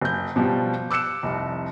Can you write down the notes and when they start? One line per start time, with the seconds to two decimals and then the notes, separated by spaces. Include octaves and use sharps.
0.02 F#1 G6
0.36 B2 F3 G3
0.91 D6 E6 F#6 C#7 E7
1.23 F1 C2